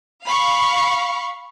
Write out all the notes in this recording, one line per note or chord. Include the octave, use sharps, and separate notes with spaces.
F5 B5 C#6